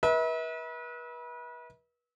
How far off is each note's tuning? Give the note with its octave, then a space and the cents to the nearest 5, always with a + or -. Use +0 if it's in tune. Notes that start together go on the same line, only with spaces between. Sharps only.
B4 -35 E5 -40